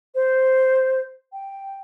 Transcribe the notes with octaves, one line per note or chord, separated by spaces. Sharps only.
C5
G5